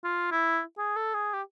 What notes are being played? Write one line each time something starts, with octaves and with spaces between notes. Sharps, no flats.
F4
E4
G#4
A4
G#4
G4